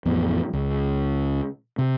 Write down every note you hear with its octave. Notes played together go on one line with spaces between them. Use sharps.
A1 F2 B3
C#2
C3